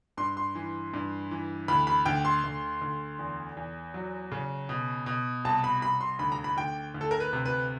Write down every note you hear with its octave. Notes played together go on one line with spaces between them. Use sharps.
G2 C6
C6
E3
G2
E3
D2 B5
B5
D2 G5
C6
D2
D2
E2
E2
F#3
C#3
B2
B2
C2 A5
B5
C2 B5
C6
D2 B5
A#5
B5
D2 G5
D2
A4
A#4
B4
C3
B4